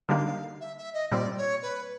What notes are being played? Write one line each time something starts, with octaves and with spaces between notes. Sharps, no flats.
D3 G3 A#3 D#4 F5
E5
E5
D#5
A#2 G3 C4 D5
C#5
B4